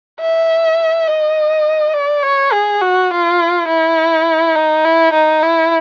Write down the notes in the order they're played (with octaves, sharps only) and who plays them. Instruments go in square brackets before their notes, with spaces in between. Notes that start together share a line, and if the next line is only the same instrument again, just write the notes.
[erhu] E5
D#5
D5
C#5
G#4
F#4
F4
E4
D#4
E4
D#4
E4